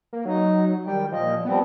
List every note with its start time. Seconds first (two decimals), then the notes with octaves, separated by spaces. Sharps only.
0.13 A#3
0.25 F#3 D#4
0.87 D#3 G3 G5
1.12 A#2 F3 D#5
1.45 F3 G3 B3 C4